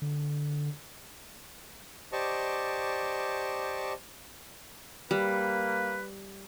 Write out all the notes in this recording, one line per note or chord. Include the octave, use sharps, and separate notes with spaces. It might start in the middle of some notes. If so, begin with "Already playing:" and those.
D3
G4 C5 D5 D#5 A5 C#6
G3 A#3 B4